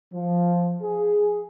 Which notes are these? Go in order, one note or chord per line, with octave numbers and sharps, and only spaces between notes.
F3
G#4